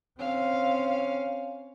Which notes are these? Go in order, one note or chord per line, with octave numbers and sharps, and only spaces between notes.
C4 C#4 F5